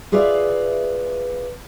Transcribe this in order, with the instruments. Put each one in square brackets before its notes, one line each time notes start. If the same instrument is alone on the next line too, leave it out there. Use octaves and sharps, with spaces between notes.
[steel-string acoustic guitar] F4 G#4 B4 D5 E5 F5